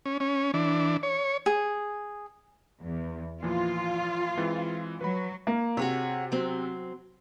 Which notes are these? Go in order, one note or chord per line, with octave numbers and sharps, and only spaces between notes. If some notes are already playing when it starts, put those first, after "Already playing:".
C#4
C#4
E3 D4
C#5
G#4
E2
A#2 E3 F3 F4
E3 G#3 C4
F#3 B4 B5
A#3
C3 F#4 G#4 C#5
F#3 C4